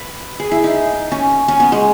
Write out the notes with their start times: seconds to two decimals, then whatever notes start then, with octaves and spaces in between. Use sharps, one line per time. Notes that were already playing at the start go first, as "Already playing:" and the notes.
Already playing: B4
0.40 G#4
0.51 E4
0.64 D#4
1.12 C#4
1.48 C#4
1.60 B3
1.72 G#3